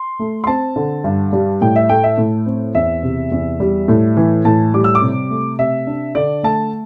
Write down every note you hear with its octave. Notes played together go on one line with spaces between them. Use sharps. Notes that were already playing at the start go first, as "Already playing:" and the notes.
Already playing: C6
A3
C6
C4 A5
D3
G2
G3
A2 G5
E5
A3 G5
E5
A2
C4
E2 E5
C3
E2
G3
A2
E3
A2 A5
G3 D6
E6
D6
C3
A3
C3 E5
D4
D3 D5
A3 A5